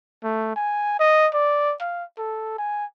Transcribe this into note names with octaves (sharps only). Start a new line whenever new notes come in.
A3
G#5
D#5
D5
F5
A4
G#5